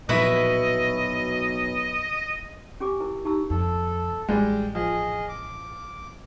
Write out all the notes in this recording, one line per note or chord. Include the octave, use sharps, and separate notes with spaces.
B1 A#2 F3 F#3 E4 F#4 B4 D#5
C#4 G4 G#5 D6
E4 A#4
D#4 G4 A5 A#5 E6
F2 A4
A1 G3 G#3 G5
F3 G#4 D#5
D6